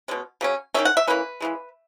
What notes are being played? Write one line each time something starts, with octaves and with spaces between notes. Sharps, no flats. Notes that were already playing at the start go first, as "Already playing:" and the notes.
B2 G#3 C#4
C#3 F#3 C#4
D#3 A#3 C#4 E5
F#5
E5
E3 A#3 C#4 B4
C#3 E3 G#3